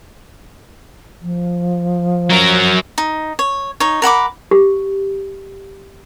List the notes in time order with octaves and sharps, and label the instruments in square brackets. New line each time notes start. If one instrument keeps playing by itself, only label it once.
[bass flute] F3
[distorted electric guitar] F#3 A#4
[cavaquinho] D#4
C#5
D#4 C#5
A#4 F#5 B5 D6
[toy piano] G4